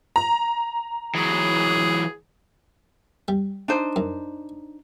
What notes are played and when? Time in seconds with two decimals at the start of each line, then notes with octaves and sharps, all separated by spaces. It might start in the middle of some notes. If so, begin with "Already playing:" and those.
0.16 A#5
1.15 E3 F#3 G#4
3.28 G3
3.68 D4 D#4 C5
3.96 F#2